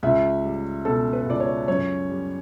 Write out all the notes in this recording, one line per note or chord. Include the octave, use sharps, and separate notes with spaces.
C#2 E5
G3
B2 A4
B4
C#2 D5
C#5
F#2 C#5
G3